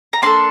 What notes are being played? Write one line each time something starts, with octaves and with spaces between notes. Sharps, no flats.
A#5
A#3 D4 A4 A5 C6